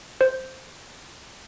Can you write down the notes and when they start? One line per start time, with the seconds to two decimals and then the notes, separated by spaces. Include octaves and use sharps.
0.21 C5